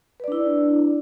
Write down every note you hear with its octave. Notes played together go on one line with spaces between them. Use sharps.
D4 E4 B4 D5